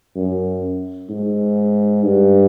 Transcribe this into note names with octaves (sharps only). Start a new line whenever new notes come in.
F#2
G#2
G2